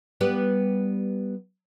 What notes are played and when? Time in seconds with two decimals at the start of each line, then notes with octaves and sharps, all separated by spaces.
0.21 G3 B3 G4